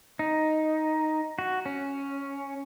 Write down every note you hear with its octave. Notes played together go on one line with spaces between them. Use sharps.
D#4
F#4
C#4